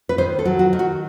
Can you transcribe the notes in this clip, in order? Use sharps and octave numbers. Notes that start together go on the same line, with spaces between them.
B4
D#3 C5
A4
F#3
F#4
D#3
F#4